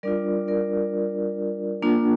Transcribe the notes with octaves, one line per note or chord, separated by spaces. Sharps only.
G3 D4 F4 A#4 D5
A#4 D5
A#3 D4 F4